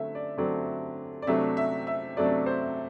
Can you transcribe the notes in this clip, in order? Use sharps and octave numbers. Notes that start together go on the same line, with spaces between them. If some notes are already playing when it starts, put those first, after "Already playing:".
Already playing: D3 F#3 A3 C4 E5
D5
D3 F#3 A3 C4 D5
D5
C3 F#3 A3 D4 E5
E5
E5
C3 F#3 A3 D4 D5
C5